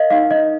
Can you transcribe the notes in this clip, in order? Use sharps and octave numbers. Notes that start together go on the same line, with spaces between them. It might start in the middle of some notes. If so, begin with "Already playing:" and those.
Already playing: A#4 D#5 F5
D#4 F5
D#5